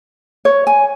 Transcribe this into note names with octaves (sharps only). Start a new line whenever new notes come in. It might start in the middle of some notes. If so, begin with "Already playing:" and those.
C#5
G#5